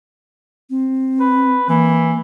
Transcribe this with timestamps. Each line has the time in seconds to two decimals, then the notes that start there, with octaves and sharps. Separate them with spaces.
0.70 C4
1.20 B4
1.69 E3 A#3